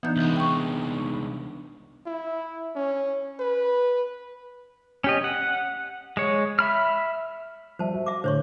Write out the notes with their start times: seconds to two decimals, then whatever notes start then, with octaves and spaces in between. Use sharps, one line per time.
0.03 E3 B3 D4 D#4 G6
0.17 C2 G#3
0.36 G5 C#6
2.06 E4
2.76 C#4
3.39 B4
5.04 C#4 G4 D#5
5.24 F#5
6.17 G#3 C#5
6.59 E5 B5 F6
7.79 F3 G3 C5 E5 A5
7.94 F#4
8.06 E5 D6
8.24 A2 D3 C5 C#5 C#6